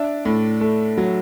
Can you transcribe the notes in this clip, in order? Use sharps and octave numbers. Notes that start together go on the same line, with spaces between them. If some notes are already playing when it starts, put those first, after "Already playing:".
Already playing: D4 E5
A2
A3
F#3